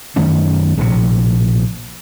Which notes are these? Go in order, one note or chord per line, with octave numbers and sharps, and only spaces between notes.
F#2 D#3 A3 C#4
A#1 A2 C3